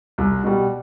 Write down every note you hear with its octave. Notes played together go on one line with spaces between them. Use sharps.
C2
B2 G3